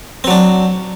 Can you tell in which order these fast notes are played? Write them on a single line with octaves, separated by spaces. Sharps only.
C4 F#3 D4